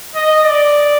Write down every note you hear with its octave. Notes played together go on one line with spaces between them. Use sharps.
D#5
D5